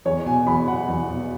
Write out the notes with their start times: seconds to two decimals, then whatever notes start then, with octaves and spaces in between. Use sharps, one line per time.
0.05 E2 C#5
0.26 B2 G#5
0.47 E2 B5
0.67 B2 F#5
0.88 E2
1.08 B2